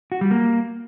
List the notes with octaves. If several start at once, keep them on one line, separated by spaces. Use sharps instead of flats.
F#4
G3
A#3